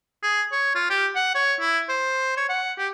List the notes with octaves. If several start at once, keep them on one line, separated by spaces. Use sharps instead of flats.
G#4
C#5
F4
G4
F#5
C#5
E4
C5
C#5
F#5
G4